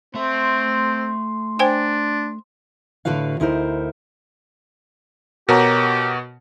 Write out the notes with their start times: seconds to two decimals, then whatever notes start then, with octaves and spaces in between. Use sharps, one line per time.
0.15 A3 C4 E5 C6
1.59 D4 C5 G5 G#5
3.05 A2 D3 F#4 B4 F5
3.40 D2 D#4 E4 A#4 C5
5.49 B2 F#4 G4 A#4 C#5 A#5